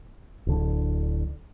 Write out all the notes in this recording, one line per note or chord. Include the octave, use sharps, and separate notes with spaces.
D1 D3